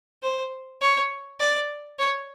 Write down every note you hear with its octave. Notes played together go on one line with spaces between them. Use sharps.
C5
C#5
D5
C#5